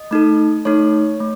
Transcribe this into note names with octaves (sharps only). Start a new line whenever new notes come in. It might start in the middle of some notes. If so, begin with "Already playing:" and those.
Already playing: D#5
A3 D#4 A4
A3 D#4 A4 C#5
A3